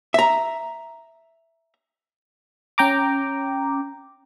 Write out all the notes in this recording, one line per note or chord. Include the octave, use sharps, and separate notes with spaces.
E5 A#5
C#4 G5 A#5 D6